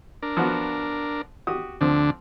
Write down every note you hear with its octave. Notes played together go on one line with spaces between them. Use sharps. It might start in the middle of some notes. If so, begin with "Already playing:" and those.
D4 A#4
F3 B3 F#4
F#4 G4 D#6
D2 D3 F3 C4 D4